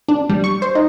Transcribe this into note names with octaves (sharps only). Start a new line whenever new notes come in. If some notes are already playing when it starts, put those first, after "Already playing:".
D4
G3
C#6
C5
D#4